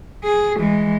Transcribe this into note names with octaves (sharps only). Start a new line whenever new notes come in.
G#4
E3 G#3